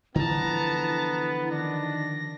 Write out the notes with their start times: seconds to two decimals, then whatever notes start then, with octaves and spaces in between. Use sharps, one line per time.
0.15 D3 E3 F3 B3 E4 A5 A#5
1.51 D#3 D4 A#6